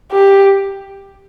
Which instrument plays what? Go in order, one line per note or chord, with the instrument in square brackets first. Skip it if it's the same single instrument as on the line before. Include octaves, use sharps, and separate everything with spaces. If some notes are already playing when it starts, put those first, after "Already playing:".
[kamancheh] G4